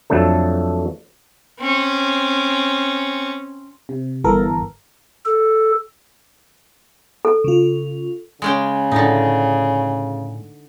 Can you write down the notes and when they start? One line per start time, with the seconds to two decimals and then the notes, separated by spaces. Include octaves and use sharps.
0.10 F2 F#3 A3 D4 A4
1.59 C4 C#4
3.89 C3
4.24 G1 E3 B3 A4 A#4
5.26 A4
7.25 A4
7.44 C#3 F4
8.42 C#3 G#3 C#4 G5
8.92 A2 D3 D#4